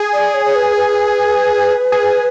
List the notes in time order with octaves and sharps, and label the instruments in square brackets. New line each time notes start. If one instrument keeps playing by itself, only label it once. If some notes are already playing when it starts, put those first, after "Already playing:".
Already playing: [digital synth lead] G#4
[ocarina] D5
C#5
C#5
B4
B4
[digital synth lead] G#4